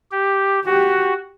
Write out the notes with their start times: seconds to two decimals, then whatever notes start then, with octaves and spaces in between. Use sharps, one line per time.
0.11 G4
0.66 F#4 G4